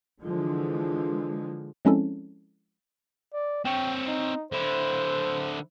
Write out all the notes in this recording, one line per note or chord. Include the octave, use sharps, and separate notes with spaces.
D3 E3 F3 G#3
F3 G#3 C4 C#4 E4 A4
D5
C4 C#5 G5
D#4
D3 E4 C5